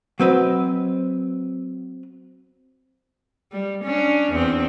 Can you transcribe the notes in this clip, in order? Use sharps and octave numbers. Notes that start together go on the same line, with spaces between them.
F#3 C4 B4 D#5
G3
C#4 D4
E2 C4